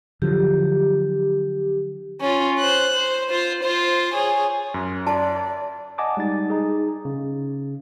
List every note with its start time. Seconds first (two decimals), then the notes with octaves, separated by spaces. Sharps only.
0.22 D3 F3 F#3 G4
2.21 C#4 F4
2.59 C5 F#6
2.95 C5
3.30 F4 C5
3.63 F4 C5
4.14 G#4 C#5
4.74 F#2
5.07 D5 A5
5.98 D#5 F#5 G#5 A5 D6 D#6
6.17 G3 G#3 D#4 A6
6.50 D#4 G#4
7.05 C#3